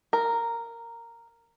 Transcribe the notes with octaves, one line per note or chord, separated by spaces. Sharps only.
A#4